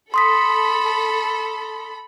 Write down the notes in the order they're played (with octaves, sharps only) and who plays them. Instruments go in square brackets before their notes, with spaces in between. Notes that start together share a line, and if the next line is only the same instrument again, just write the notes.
[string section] A4 B5 [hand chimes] C6 D#6 B6